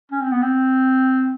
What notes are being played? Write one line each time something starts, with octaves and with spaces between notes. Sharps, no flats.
C#4
C4
B3
C4